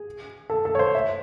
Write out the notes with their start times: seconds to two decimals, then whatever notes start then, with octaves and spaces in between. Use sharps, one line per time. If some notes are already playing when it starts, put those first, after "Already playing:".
Already playing: G#4
0.50 A4
0.65 A4
0.75 C#5
0.79 C5
0.95 E5